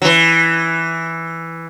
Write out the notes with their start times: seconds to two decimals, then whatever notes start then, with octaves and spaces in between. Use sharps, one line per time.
0.02 F#3
0.05 E3